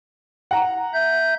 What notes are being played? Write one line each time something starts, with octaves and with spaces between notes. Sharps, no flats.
F#5 A#5
E5 G6